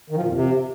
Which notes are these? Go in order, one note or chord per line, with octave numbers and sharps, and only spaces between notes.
D#3
F3
A#2
F2
C3